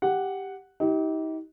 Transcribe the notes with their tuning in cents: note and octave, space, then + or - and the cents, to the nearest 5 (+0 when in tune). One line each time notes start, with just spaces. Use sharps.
G4 +0 F#5 +0
D#4 +40 G4 -20